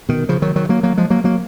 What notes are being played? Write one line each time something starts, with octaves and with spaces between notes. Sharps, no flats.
B2 D#3
C#3 F3
D#3 F#3
D#3 F#3
F#3 A#3
F#3 A#3
F3 G#3
F#3 A#3
F#3 A#3